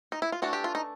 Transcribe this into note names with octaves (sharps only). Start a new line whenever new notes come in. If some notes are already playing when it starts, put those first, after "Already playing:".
D#4
E4
F4
E3 A3 D4 F#4
G4
F4
D#4